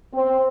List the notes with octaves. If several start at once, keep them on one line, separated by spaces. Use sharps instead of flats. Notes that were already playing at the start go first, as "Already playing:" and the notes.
C4